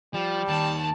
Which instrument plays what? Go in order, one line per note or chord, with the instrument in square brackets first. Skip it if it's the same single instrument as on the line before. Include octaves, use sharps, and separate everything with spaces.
[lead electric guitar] F3 [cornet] G3
[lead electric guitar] D#2 D#3 [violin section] A5